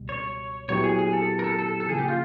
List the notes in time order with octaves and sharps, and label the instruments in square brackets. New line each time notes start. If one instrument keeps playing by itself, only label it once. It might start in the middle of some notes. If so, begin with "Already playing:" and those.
Already playing: [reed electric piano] C#2 B2 G3
[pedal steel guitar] C#5
[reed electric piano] A#2 F#3 B3 E4 G4 [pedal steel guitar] C#5
[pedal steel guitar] G#4
G#4
A4
A#4
A4
A4
A4
[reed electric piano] C#3 F3 A#3 [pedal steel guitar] G#4
[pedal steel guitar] G4
F4